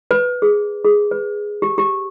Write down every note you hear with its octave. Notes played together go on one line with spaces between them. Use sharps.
B4
G#4
G#4
B4
G4
G4